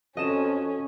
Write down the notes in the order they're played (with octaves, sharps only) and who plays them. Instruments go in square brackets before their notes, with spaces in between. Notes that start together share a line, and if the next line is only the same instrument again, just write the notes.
[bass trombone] F2 [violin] C#4 [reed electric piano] F#4 A4 [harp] D#5 E7